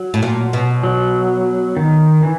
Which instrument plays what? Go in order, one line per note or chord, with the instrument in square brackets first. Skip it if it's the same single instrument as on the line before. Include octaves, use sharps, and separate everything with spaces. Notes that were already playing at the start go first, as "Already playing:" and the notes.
Already playing: [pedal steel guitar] F#3
[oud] A2
A#2
B2
[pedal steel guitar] F#3
D#3
E3